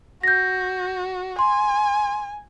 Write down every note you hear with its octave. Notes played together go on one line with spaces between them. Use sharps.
F#4 G6 A#6
G#5 C6